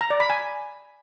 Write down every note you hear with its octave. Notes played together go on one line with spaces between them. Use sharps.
A#5
D5
B5
G#5